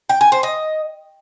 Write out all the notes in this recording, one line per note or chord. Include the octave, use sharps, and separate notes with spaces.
G5
G#5
C5
D#5